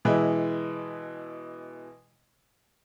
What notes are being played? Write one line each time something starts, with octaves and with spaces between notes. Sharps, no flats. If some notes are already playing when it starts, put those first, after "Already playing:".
B2 E3 G#3 E4